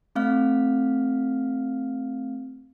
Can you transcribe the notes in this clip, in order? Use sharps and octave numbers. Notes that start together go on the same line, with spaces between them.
A3 C4 F5 F6